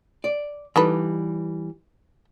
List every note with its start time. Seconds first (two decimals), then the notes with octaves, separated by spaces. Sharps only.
0.24 D5
0.76 E3 G3 D#4 A4 B4